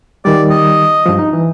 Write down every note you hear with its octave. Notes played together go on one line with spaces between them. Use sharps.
D#3 G3 D5
D#5
G2 F3
D#4
E3